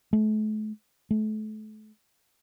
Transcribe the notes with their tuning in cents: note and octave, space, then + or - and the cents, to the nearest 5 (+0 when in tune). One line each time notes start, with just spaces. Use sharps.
A3 -40
A3 -35